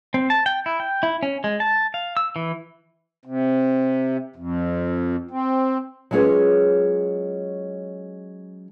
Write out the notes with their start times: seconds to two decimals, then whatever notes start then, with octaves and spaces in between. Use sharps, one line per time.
0.14 C4
0.30 A5
0.46 G5
0.66 E4
0.80 G5
1.03 E4
1.23 C#4
1.44 G#3
1.60 A5
1.94 F5
2.17 E6
2.36 E3
3.25 C3
4.36 F2
5.31 C4
6.11 F#3 G#3 C#4 F4 G#4 B4